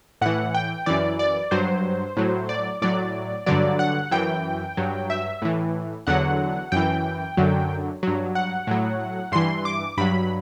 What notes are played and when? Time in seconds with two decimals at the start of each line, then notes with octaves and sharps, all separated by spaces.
0.21 A2 E3 F#5
0.55 G5
0.86 F#2 E3 D5
1.19 D5
1.51 G2 F#3 C5
2.17 A2 F#3
2.49 D5
2.82 A2 F#3 D5
3.46 G2 D3 F#3 D5
3.79 F#5
4.11 F#2 E3 G5
4.77 G2 F#3
5.10 E5
5.42 A2 E3
6.07 E2 D3 F#3 F#5
6.72 F#2 E3 G5
7.37 F#2 D3 F#3
8.03 G2 F#3
8.35 F#5
8.67 A2 F#3
9.32 G2 E3 C6
9.65 D6
9.98 G2 F#3 B5